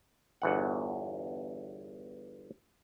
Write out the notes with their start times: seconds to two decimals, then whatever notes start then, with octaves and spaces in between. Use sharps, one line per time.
0.42 G1 E2 F#5